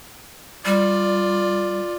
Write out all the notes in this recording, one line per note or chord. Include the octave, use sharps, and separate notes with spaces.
G3 F4 D5